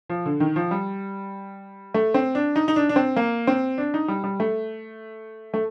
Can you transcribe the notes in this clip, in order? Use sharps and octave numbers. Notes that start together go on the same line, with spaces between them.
F3
D3
D#3
F3
G3
A3
C4
D4
D#4
D#4
D4
D4
C4
A#3
C4
D4
D#4
G3
G3
A3
A3